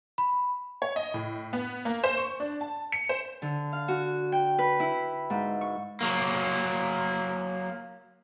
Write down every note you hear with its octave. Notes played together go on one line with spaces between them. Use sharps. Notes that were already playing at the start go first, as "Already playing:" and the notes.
B5
C#5
D#5
A2
B3
A#3
C5
C#6
D4
A5
C#7
C5
D3
F5
F#4
G5
B4
E4
G#2
C#6
F#3 A#3